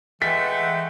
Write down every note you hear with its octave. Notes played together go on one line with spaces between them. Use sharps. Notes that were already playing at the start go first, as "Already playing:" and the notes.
E3 G#3 A3 F#5 G5 B6